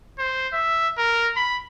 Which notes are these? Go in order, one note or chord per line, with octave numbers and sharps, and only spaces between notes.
C5
E5
A#4
B5